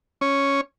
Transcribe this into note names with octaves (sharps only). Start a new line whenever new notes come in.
C#4 C#5